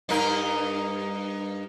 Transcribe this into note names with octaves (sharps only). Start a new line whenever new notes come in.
G2 D#4 A#4